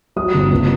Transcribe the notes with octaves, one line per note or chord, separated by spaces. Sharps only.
F#3 D#6
G1
C#2